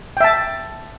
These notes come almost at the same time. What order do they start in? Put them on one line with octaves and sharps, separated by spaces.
G5 E5 A5